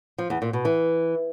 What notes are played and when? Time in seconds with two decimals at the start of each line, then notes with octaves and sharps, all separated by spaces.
0.18 F3
0.30 E2
0.42 A#2
0.53 B2
0.65 E3